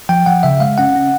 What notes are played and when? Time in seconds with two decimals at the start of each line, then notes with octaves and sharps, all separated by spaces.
0.09 F3 G5
0.26 F3 F#5
0.43 C#3 E5
0.60 G#3 F5
0.78 C#4 F#5
0.96 C#4